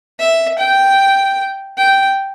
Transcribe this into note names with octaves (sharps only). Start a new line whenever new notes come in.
E5
G5
G5